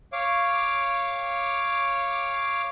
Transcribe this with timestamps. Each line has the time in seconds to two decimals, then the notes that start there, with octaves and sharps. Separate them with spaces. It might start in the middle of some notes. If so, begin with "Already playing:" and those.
0.13 C#5 F5 D6